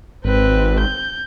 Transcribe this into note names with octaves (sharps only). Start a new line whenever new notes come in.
G#1 C4 B4
G6